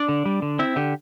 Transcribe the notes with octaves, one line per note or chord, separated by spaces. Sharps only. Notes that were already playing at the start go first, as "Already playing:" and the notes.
Already playing: D4 D5
D3
G3
D3
C4 E4 E5
D3 G4